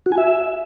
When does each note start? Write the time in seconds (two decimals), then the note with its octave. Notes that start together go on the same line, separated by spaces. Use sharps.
0.06 F#4
0.12 G#5
0.18 E5